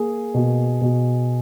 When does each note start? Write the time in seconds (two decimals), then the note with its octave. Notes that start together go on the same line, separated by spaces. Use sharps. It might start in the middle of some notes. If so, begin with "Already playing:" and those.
Already playing: A#3 G#4
0.34 B2
0.81 B2